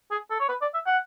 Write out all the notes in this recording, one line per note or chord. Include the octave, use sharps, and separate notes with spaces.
G#4
A4
C#5
B4
D5
E5
F#5